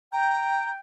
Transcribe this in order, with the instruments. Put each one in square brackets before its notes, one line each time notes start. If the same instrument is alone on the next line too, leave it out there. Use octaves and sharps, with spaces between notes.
[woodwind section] G5 [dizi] A#5